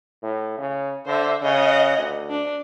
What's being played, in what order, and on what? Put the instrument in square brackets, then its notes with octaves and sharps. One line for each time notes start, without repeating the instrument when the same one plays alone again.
[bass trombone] A2
C#3
[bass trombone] D3 [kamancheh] C5 E5
[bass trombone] C#3 [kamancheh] D#5 F#5
[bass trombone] D2
[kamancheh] D4